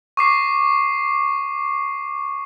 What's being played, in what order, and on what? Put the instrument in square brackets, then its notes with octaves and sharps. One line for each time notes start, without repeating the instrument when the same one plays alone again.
[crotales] C#6 D6 C7